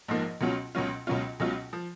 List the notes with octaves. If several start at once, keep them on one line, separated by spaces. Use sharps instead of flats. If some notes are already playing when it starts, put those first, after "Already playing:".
A#1 G#2 F3 A#3
C#2 B2 F#3 C#4 F4
C#2 B2 F#3 C#4 F4
C#2 B2 F#3 C#4 F4
C#2 B2 F#3 C#4 F4
F3